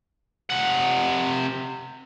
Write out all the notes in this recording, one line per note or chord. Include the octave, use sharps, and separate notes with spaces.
C3 F#5